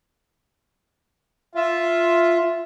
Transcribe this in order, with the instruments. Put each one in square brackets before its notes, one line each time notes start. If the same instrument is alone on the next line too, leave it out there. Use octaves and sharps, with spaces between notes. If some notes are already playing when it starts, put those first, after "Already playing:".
[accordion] F4 [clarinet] E5